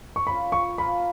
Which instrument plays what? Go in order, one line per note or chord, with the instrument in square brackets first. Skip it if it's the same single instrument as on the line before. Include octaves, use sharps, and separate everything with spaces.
[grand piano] C#6
[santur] C#4 F4 B4 [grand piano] B5
[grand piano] C#6
[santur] F3 A#3 F4 B4 [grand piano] B5